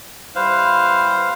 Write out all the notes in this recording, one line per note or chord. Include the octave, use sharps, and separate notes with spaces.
G3 E4 B4 C5 F5